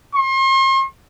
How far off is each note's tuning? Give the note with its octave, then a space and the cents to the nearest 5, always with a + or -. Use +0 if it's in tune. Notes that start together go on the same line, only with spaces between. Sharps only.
C6 +40